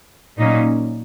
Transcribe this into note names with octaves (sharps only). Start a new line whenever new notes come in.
A#2 F#3 A#3 C#4 D#4